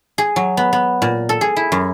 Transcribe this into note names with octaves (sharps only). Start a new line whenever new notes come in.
G#4
F#3
B3
B3
A#2
A4
G#4
E4
F#2